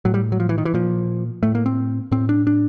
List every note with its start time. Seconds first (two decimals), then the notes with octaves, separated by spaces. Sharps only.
0.05 A2 F#3
0.14 G3
0.32 F#3
0.40 F3
0.49 E3
0.58 D#3
0.65 E3
0.74 A#2 F3
1.43 A2 A3
1.55 A#3
1.66 C4
2.12 A2 C4
2.29 D4
2.47 D4